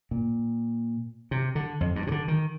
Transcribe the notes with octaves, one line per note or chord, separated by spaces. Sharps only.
A#2
C3
D3
F2
G2
C3
D3
D#3